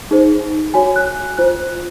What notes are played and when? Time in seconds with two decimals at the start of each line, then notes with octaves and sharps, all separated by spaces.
0.11 D#4 G#4 C5
0.74 F#4 C#5 G#5
0.96 F#6
1.37 F4 C5 F#6